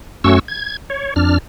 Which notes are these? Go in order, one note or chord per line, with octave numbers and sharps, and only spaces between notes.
F#2 A3 C#4 F#4 C#6 E6
G#6
C#5
F2 D4 F6